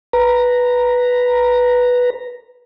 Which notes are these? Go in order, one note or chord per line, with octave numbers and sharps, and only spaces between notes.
B4 A#5